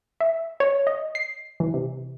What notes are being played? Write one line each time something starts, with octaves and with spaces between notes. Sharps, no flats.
E5
C#5
D#5
C7
E3
C3